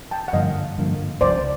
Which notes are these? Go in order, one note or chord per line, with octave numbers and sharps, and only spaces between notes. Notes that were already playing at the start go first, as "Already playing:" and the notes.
G5 A5
F#5
G2 D3 F3 A#3 D#5 F5
G2 D3 F3 A#3
C#2 C#3 F3 C5 D5